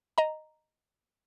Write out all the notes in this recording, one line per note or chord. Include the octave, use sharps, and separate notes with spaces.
D#5 A#5